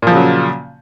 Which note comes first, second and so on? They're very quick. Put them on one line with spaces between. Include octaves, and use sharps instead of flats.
A#2 F3 C#3 F#3